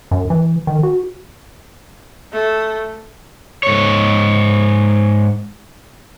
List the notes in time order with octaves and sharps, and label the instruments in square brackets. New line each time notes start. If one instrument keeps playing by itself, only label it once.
[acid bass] F#2
E3
D#3
F#4
[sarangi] A3
[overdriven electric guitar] G#2 C#5